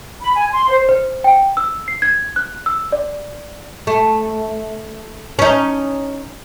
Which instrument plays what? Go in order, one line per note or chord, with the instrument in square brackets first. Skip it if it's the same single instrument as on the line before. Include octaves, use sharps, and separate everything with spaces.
[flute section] B5
G#5
C6
C5
[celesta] C5
G5
E6
C7
G#6
F#6
E6
D5
[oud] A3
C#4 D#4